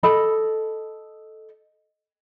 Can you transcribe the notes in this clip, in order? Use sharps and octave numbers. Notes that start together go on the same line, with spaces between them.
A4 D#5 B5